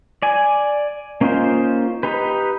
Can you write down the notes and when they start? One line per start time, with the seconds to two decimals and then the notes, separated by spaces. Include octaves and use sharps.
0.22 D5 G#5
1.21 A#3 C#4 D#4 F4 C5
2.03 D#4 G4 B4